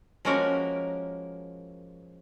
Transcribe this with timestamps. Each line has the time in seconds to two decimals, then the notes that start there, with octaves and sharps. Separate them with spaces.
0.25 F3 G#3 A#3 C#4 F#4 A#4